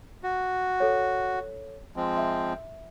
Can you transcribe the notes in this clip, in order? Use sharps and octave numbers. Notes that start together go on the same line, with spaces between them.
F#4
A4 C#5
F3 G#3 C4
E5